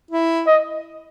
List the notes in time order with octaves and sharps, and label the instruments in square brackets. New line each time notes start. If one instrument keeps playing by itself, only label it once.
[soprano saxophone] E4
[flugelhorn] D#5